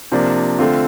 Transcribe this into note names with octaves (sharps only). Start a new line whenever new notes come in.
C3 F3 A#3 D4
D3 A3 C4 F4